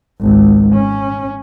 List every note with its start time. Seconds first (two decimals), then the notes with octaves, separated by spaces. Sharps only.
0.20 G#1 C#2
0.74 C#4